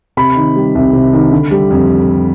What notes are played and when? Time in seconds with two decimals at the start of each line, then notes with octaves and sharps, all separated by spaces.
0.17 C3 B5
0.36 D#3
0.56 G3
0.75 C2
0.93 C3
1.13 D#3
1.32 D3
1.51 G3
1.70 F2